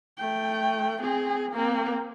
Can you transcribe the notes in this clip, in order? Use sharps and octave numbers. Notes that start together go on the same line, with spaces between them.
A3 G5
C4 G#4
A#3 C4